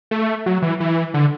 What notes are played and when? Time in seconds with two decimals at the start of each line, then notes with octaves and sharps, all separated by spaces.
0.11 A3
0.46 F#3
0.62 E3
0.80 E3
1.14 D3